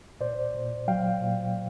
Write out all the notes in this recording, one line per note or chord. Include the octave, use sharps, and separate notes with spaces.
A#2 C5 D5
A#2
F#3 F5 G5
A#2